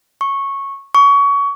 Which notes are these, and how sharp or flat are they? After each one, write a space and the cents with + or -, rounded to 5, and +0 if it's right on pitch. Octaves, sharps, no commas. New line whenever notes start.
C#6 -10
C#6 +25